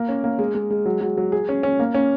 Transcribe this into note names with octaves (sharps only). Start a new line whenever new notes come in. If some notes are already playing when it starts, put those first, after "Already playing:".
Already playing: A#3
C#4
A#3
G#3
G#3
G#3
F#3
F#3
F#3
G#4
C#4
C#4
A#3
C#4